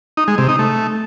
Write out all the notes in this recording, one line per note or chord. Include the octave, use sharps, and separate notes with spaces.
D#4
G#3
C3
D#4
A3